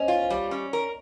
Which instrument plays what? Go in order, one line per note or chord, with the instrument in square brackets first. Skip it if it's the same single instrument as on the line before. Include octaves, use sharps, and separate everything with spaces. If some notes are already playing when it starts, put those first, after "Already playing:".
Already playing: [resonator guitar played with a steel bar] C#4 [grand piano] C5 C#5 D#5
[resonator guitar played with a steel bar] F4
[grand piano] C5
[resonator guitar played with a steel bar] G3 [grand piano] C#5
[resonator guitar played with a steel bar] C#4
A#4